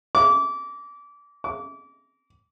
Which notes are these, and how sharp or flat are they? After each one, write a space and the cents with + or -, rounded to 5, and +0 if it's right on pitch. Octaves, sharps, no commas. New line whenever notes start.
D6 -25
D6 -30